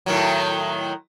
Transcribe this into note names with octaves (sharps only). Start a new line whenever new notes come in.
A2 D#3 F#3